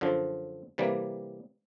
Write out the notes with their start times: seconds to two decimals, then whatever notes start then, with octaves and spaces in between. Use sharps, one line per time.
0.01 F#2 D3 F3
0.78 C3 E3 G3 A#3